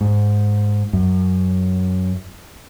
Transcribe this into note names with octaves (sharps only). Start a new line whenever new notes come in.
G#2
F#2